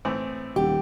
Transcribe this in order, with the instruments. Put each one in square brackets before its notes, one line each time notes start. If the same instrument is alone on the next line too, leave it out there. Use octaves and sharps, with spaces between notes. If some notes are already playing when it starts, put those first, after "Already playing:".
[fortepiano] A2 E3 C4
[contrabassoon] D#1 [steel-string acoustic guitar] G4